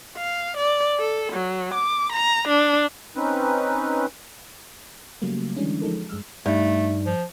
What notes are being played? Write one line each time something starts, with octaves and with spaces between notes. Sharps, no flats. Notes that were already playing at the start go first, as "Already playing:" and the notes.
F5
D5
A4
F#3
D6
A#5
D4
C4 C#4 D#4 B4
C#3 F#3 G3 A3 A#3
D3 E3 G3 G#3 C#4 D4
F3 G#3 D#4 A4 A#4
G2 G#3 E6 F6
G2 A3 D#4
F3